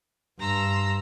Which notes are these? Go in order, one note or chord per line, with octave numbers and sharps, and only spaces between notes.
G2 A#5 C6 E6